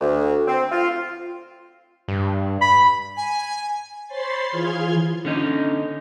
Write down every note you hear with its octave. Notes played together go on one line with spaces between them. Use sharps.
D2
C4
F4
G2
B5
G#5
C5 C#5 B5 C6 A6 C7
E3 F4 G#4 C6 F6 G#6
D3 C#4 D#4